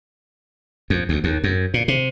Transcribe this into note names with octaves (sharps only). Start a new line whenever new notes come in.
F2
D2
D#2
F#2
A#2
C3